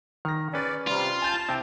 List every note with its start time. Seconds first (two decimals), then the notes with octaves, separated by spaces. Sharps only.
0.25 D#3 F6 A#6
0.54 C#4 G#4 B4 D5
0.87 C3 G3 F4 F6
1.22 G#5 A5 G6
1.49 C3 C4 E4 G5